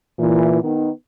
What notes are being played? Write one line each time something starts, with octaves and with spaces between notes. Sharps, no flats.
A#2 E3
D#3 B3